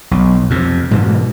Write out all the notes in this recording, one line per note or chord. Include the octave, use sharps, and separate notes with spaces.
B1
F2 C3
G#2 B2 E3